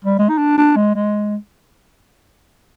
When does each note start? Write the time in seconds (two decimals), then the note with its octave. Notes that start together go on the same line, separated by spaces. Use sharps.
0.05 G3
0.19 G#3
0.29 D#4
0.38 D4
0.58 D4
0.76 G#3
0.95 G#3